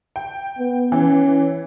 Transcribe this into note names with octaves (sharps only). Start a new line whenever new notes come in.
G5
B3
E3 C#4